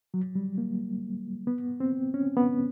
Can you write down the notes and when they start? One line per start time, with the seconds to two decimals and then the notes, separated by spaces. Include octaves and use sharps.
0.14 F#3
0.35 G3
0.58 A#3
1.47 B3
1.80 C4
2.14 C#4
2.37 B3